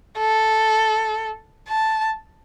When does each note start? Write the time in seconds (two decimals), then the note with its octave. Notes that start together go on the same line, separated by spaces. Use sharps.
0.18 A4
1.69 A5